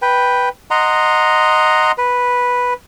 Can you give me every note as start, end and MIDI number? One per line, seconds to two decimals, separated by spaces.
0.02 0.49 71
0.02 0.49 79
0.71 1.92 75
0.71 1.92 78
0.71 1.92 82
0.71 1.92 84
1.98 2.74 71